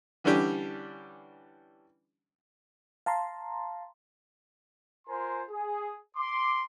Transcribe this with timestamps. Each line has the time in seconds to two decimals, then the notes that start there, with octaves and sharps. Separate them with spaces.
0.24 D3 E3 G3 C#4 D4 G4
3.06 F5 A5 A#5 C6
5.08 F4 A#4 C5 G#5 C6
5.50 G#4
6.17 C6 D6